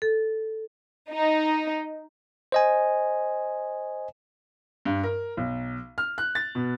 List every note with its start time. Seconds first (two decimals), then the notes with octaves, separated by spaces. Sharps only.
0.02 A4
1.11 D#4
2.52 C5 D#5 G#5
4.85 G2
5.04 A#4
5.37 B1
5.98 F6
6.18 F#6
6.35 A6
6.55 B2